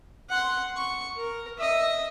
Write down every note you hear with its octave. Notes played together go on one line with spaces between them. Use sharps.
F#5 C6
C#6
A#4
D#5 E5